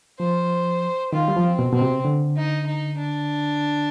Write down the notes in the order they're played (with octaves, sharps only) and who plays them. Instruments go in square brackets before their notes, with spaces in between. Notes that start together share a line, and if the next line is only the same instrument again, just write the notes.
[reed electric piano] F3 [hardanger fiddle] C5
[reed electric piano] D#3 [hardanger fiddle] F4
[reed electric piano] G3
F3
[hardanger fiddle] C4
[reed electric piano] B2
[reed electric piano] B2 [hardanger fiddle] C4
[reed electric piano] C3
D3
[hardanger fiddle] D#4
D#4
D4